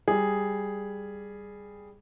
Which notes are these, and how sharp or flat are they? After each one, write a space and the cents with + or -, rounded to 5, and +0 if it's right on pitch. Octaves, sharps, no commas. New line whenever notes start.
G3 +5 G#4 +0